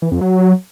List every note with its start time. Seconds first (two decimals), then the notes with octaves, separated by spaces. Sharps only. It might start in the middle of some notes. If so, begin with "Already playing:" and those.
0.02 E3
0.12 F2
0.21 F#3